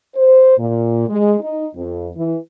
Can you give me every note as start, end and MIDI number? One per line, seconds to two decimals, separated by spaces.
0.16 0.55 72
0.58 1.06 46
1.09 1.37 56
1.40 1.67 63
1.76 2.10 41
2.16 2.36 52